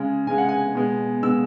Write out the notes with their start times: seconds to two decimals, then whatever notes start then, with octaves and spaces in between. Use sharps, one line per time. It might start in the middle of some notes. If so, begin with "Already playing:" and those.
Already playing: C#3 G#3
0.27 C#3 G#3 G#5
0.38 F#5
0.49 G#5
0.75 B2 G#3
1.23 B2 G#3 E6